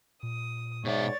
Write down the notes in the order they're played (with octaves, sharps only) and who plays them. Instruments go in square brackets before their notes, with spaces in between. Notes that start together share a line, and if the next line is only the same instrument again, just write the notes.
[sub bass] A#2 [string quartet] D#6
[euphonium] G#2 [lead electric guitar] B2 E5 [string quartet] C#5 D5 A6